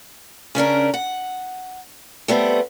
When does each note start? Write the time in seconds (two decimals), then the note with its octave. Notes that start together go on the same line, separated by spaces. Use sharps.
0.55 C#3 C#4 D4 A#4
0.94 F#5
2.28 G3 A3 B3 C4